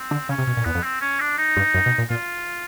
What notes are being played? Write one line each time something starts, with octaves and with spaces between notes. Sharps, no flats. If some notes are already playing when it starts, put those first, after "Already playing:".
Already playing: C4
D3
C#3 C#4
C3
B2
A#2
E2 B3
F2
C4
C#4
D4
D#4
G2
F#2
B2
A#2
A#2 F4